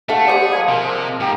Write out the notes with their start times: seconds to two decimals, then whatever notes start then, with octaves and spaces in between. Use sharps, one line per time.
0.09 A3 D4 A4 F5 F#5
0.27 G3 G#3 D4 G4 G#4 C5 D5
0.52 F3 G#3 A#3 G#6
0.69 C3 A#4
1.20 G#2 G4 G5 A#5